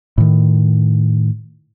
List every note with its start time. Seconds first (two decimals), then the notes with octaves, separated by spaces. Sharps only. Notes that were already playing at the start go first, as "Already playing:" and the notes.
0.18 A2 D#3